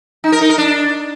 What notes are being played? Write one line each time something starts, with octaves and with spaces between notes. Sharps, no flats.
D#4
A#4
D#4
A#4
D4